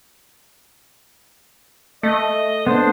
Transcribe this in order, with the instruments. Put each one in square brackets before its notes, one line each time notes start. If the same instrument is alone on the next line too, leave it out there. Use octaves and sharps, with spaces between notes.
[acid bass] A3 [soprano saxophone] D#5
[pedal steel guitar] B3 D4 [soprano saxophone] C5